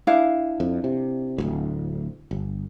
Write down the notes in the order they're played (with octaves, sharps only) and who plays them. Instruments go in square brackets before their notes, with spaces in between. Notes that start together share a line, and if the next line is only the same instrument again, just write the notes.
[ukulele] D4 E4 F5
[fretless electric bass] F2
C3
D1 G#1 D2
G1